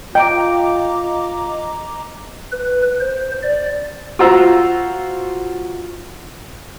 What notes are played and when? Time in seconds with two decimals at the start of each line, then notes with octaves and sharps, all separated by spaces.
0.15 F4 D#5 G5 A#5 D6
2.52 B4
3.00 C5
3.43 D5
4.19 F4 F#4 C5 A#5 E6